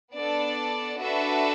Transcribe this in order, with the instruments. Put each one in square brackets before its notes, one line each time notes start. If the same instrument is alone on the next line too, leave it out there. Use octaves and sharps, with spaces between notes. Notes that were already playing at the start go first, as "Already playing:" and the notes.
[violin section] B3 D4 A4 D5
D4 F#4 A4 B4 E5